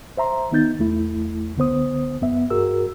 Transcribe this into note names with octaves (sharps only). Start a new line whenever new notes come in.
C5 E5 A#5 C6
D#3 B3 D#4 G6 A6
E2 A3 E4
C#2 D3 B3 C5 D#6
F#2 B3 E5
G2 F#4 G#4 A#4 E6